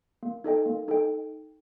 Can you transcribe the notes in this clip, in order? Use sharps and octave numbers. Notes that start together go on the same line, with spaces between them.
A#3
D#4 A4 D#5 G5
A#3
D#4 A4 D#5 G5